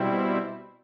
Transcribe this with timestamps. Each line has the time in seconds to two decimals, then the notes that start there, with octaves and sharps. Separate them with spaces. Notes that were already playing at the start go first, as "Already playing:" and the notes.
Already playing: B2 G3 C4 E4